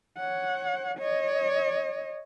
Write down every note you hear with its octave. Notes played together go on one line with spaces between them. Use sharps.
C#5 F#5
C#5 D#5